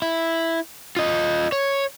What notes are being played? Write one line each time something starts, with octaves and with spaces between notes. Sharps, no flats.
E4
F4 D#5
C#5